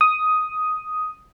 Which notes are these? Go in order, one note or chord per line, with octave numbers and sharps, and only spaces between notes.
D#6